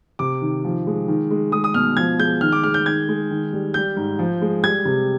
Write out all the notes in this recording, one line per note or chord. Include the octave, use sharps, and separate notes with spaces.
C3 D6
D#3
F3
G#3
D#3
G#3
G#3 D#6
D#6
B2 F6
F3 G#6
G#3 G6
D#3 F6
D6
G#3 F6
G6
D#3 G#6
G#3
D#3
G3
G3 G6
G#2
F3
G#3
G3 G#6
C3